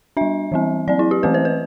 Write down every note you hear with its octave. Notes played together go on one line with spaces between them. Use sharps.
G3 D4 E5
E3 G3 C4
F#3 C4 D5
E4
G4
E3 A3 C4 B4
C5
B4